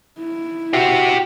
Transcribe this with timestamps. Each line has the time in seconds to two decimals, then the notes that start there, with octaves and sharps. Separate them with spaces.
0.19 E4
0.73 F#4 G4 E5